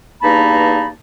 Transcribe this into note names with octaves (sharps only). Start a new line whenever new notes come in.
E2 G2 A#3 D#4 A5 B5